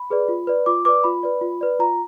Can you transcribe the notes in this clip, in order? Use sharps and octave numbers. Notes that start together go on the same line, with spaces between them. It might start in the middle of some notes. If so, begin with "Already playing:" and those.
Already playing: B5
G#4 B4 D5
F4
B4 D5
F4 D6
B4 D5 D6
F4 B5
B4 D5
F4
B4 D5
F4 A#5